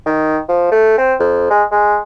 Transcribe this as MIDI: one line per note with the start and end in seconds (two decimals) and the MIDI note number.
0.06 0.38 51
0.49 0.67 53
0.71 0.96 57
0.98 1.14 60
1.20 1.47 41
1.50 1.64 56
1.72 1.99 56